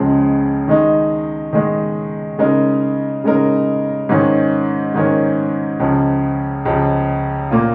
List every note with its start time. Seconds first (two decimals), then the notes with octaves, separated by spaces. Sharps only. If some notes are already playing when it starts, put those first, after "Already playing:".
Already playing: C#2 C#3 F3 G#3
0.68 D#3 G#3 D#4
1.53 D#3 G#3 D#4
2.39 C#3 G#3 D#4 A#4
3.24 C#3 G#3 D#4 A#4
4.09 G#2 D#3 C#4 A#4
4.94 G#2 D#3 C#4 A#4
5.80 C#2 C#3 F3
6.65 C#2 C#3 F3
7.51 A#2 A#3 F4